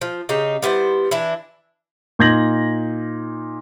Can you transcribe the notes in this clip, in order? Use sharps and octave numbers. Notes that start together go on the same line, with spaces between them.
F3
C#3 D#4 G4
G3 B3 E4 C5
E3 D4 E4
A#2 D#4 G6 G#6 A#6 F#7